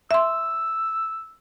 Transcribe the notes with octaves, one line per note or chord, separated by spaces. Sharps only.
E5 C6 E6